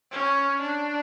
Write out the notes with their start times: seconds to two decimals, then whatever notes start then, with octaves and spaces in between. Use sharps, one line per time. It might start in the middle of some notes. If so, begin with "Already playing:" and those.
0.12 C#4
0.61 D4